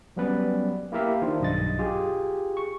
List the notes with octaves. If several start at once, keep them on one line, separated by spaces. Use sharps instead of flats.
F#3 G3 B3 C#4 B4 D5
A#3 E4 G4 A#4 E5 F5
D#3 D4 E4 F4 C5
B1 G2 D#5 A6
F4 G4 G#4
C#6